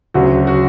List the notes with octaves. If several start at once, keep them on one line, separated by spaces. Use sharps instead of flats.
D2 C#3 F#3 F#4
F#4